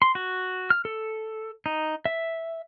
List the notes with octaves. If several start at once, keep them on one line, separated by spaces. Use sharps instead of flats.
C6
F#4
F6
A4
D#4
E5